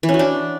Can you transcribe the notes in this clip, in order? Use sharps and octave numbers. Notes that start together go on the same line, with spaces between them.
E3
C#4
F#4
D4